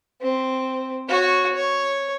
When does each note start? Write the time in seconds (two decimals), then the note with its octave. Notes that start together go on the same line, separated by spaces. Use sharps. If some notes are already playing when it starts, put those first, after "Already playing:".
0.22 C4
1.08 F#4 C#5
1.55 C#5